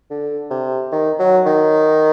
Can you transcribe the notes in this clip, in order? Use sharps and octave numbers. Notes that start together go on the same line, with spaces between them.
D3
C3
D#3
F#3
D#3